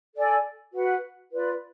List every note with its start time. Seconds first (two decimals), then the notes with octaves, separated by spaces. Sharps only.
0.15 A4 D5 G#5
0.72 F#4 B4 F#5
1.30 F4 B4 D5